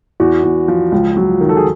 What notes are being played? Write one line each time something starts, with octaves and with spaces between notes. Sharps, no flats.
E2 F#4
E2
F3
C#2
F#3
D#3
A4
G#4